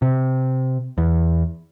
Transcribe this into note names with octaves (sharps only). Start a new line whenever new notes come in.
C3
E2